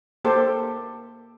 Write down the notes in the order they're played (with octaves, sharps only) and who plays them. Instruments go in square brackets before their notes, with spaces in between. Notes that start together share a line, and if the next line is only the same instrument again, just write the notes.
[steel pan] A#3 G4 A4 C5